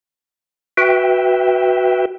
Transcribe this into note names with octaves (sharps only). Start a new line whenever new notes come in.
F#4 B4 E5 G5